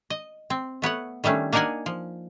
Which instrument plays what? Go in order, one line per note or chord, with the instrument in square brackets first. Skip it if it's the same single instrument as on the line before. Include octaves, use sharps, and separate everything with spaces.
[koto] D#5
C4
A3 B3 C#5 F#5
D#3 G3 A3 C#4 D4
A#3 D4 D#4 A#4 F#5 G#5
F3